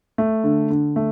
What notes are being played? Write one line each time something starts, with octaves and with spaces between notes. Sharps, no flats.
A3
D3
D3
A3